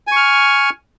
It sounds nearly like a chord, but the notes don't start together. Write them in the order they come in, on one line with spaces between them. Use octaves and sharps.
G#5 C#6 F6